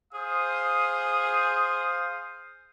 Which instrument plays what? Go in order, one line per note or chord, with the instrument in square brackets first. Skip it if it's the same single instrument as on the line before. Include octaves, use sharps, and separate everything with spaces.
[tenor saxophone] G#4 [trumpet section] C5 F5 D#6